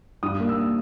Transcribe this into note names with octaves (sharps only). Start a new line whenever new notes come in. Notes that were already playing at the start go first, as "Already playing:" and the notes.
G2 D#6
A#3
E6